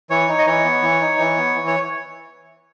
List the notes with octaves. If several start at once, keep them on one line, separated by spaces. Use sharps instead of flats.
E3 C#5
D#4
D#5
E3 C#5
B3
E3
D#4
E3
B3
E3
C#5